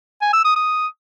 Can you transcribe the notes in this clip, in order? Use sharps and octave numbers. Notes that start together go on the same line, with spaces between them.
G#5
E6
D#6
D#6